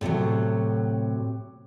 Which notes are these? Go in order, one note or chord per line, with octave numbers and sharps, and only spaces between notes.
A2 C3 E3 F#3